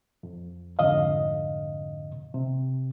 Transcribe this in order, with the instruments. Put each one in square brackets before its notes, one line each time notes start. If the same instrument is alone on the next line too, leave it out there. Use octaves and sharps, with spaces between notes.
[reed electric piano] F2
C2 F2 G#2 D3 D#5 F5
C3